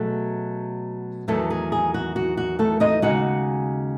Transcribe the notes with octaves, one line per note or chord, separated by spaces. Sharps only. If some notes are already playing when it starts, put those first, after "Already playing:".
Already playing: B2 F#3 A3 G#4
E2 D#3 F#3 A3 A4
G#4
G#4
F#4
F#4
F#4
A3 A4
D#4 D#5
D#2 C#3 G#3 D#4 F#4 F#5